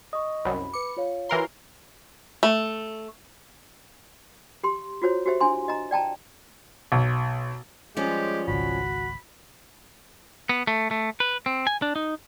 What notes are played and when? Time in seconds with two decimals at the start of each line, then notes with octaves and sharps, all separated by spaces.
0.13 D#5 C#6 D#6
0.45 C2 F#2 B5
0.73 B4 D6 C#7
0.97 F4 C#5 F5
1.29 E3 F#4 A#4 A#5 C6
2.43 A3
4.63 G4 C6
5.02 F4 F#4 C5 C#5
5.26 F#4 G4 C5 E5
5.40 D4 E4 G#5 C6
5.68 D#5 A#5
5.91 D5 G5 A5 A#5
6.92 B1
7.97 F3 G3 G#3 C#4 G4
8.48 G#1 C#2 F#4 B5
10.49 B3
10.67 A3
10.91 A3
11.20 B4
11.46 C4
11.67 G#5
11.82 D4
11.96 D#4